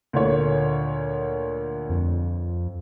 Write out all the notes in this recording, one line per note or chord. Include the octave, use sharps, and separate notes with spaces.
D2 A#2 C#5
F2